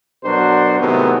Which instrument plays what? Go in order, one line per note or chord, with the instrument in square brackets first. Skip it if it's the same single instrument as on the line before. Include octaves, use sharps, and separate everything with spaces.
[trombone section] B2 F#3 D4 F#4 A#4 C5
A2 C3 D#3 F#3 G#3 B3